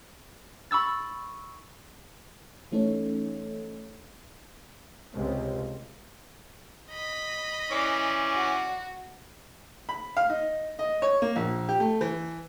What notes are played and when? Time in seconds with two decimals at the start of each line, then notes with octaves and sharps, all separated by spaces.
0.71 B5 C#6 E6 A6
2.72 E3 A3 C#4 D#4 A4 C#5
5.13 C#2 C3
6.91 D#5 B5
7.71 E3 C#4 D5
8.33 F#4
9.89 B5
10.17 F5
10.30 D#4
10.79 D#5
11.02 C#5
11.22 A#3
11.36 A#1
11.68 G4
11.80 A3
12.01 E3